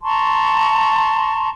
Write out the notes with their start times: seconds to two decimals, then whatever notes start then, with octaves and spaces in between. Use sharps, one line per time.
0.03 A5 A#5 C6 C#6